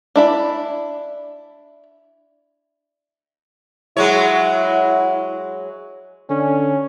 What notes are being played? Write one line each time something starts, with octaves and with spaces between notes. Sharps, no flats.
D4 E4 B5
F#3 G#3 E4 C#5
D3 C#4